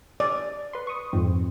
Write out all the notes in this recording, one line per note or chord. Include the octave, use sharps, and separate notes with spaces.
D5
B4 C6
C#6 D#6
F2 G#2 C4